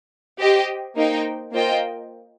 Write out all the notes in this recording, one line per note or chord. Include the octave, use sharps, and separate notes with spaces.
G4 C5 D#5 G5
A#3 D#4 C5 G5
A#3 F4 C5 D#5 G5